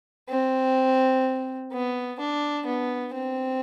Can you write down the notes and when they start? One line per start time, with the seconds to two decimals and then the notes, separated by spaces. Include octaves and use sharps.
0.29 C4
1.72 B3
2.19 D4
2.66 B3
3.14 C4